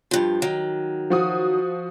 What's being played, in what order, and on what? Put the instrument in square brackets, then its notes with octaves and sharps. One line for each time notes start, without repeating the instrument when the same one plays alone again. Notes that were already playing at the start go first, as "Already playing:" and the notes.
[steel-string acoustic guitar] G2 F3
D#3 F#3
[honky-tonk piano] F3 F#4 D#6